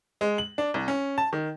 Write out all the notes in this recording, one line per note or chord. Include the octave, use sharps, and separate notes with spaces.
G#3
F#7
D4
C2
C#4
A5
D#3